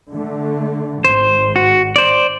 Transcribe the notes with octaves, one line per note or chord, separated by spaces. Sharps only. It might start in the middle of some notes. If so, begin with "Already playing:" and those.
D3 A3
G#1 C5
F#4
C5 D5